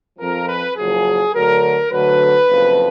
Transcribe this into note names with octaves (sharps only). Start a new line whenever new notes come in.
F2 F3 A#4
B4
F#1 F#2 F3 G#4
D2 D3 F#3 A#4
D2 D3 F#3 B4
F#1 F2 F3